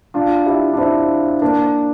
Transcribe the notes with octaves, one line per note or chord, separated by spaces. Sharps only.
D4 F4
E4 G4
D4
C4 E4
A#3 D4